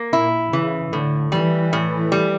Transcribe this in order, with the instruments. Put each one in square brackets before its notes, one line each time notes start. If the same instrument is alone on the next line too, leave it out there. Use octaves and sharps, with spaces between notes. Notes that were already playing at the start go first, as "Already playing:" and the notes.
Already playing: [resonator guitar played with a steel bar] A#3
[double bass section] A#2 [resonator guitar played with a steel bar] E4
[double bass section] C#3 [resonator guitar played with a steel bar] E3
[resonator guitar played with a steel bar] A2 [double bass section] D3
[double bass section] E3 [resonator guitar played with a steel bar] G3
[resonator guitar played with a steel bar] A2
G3